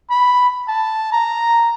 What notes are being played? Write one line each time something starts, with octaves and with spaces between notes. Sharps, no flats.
B5
A5
A#5